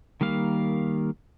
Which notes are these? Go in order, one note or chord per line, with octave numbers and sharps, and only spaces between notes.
D#3 G3 A#3 F5